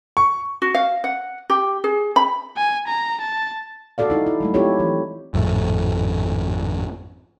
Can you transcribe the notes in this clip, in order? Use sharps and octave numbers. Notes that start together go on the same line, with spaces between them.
C#6
F#4
F5
F#5
G4
G#4
B5
G#5
A#5
A5
F#4 A4 D5 F5
G3 D#4 E4
E4
F#3 G#3 A3
C4 E4 F4 G4 A4 C#5
E3 F3
G#1 F2 A2 A3